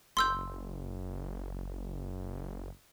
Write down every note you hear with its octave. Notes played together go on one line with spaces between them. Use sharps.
F#1 C6 E6 G6